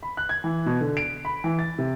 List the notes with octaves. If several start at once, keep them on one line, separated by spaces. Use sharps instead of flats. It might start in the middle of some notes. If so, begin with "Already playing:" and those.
B5
F#6
G#6
E3
B2
D3
D7
B5
E3
A6
C3